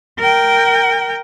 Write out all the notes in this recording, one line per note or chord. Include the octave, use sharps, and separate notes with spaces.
A#4 G5